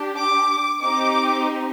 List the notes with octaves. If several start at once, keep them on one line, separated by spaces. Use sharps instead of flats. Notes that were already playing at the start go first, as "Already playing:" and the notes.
Already playing: D4 G4
D6
C4 D#4 G4 D6